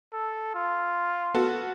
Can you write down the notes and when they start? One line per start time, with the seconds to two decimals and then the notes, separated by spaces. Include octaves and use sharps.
0.13 A4
0.55 F4
1.35 B3 F#4 A4